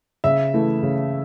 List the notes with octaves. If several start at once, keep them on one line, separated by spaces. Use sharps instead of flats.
C#3 E5
E3 A3 E4
C#3